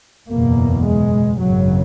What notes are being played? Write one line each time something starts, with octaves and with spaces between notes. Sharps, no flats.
F#1 E2 B2 A#3
G#3
G#1 F#2 C#3 F#3